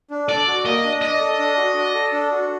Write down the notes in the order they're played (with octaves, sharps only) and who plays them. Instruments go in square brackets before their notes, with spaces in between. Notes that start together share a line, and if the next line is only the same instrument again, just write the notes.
[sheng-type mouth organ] D4
[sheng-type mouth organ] A4 [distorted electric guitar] D5
[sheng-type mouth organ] F#4
[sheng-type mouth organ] A#3 [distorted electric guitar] D#5
[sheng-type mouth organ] D4
[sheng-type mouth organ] D5 [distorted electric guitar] D#5
[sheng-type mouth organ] A4
D4
F#4
D5
A4
D4
F#4